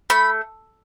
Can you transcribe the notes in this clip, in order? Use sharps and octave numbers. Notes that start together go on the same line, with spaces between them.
A3 B5